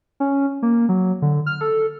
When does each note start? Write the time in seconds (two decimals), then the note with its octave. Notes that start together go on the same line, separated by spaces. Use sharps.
0.20 C#4
0.62 A#3
0.89 F#3
1.22 D3
1.46 F6
1.61 A4